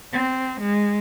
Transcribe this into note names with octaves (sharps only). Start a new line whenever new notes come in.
C4
G#3